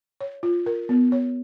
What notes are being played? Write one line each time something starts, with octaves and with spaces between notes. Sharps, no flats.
C#5
F4
A#4
B3
C#5